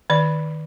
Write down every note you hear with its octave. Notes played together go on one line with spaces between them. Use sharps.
D#3 D5